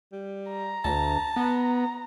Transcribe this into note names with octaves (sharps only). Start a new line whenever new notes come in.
G3
A#5
D2 A5
B3 A#5